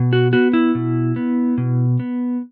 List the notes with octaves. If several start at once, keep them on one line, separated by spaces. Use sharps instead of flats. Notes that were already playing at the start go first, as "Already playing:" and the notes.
Already playing: B2
F#4
B3 F#4
E4
B2
B3
B2
B3